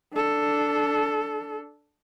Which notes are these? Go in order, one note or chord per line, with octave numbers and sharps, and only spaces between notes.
D4 A4